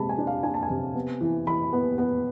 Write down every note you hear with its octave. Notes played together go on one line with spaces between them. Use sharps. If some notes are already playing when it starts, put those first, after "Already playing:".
Already playing: C3 G#3 A5 B5
G#5
D4
F5
D4 G#5
A5
G#5
C3
B3
E3
E3 B5
B3
B3